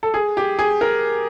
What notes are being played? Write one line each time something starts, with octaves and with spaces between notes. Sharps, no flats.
A4
G#4
G4
G#4
A#4